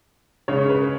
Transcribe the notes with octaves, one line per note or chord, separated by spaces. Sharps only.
C#3 G#3 C#4 C#5
B4